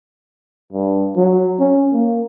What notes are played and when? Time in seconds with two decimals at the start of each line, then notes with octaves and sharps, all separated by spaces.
0.72 G2
1.16 F#3
1.59 C#4
1.93 A#3